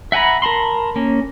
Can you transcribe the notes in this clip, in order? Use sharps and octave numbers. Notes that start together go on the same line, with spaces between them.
E5 F#5 G#5 A#5 B5
A#4 A5 B5 C6
A#3 C#4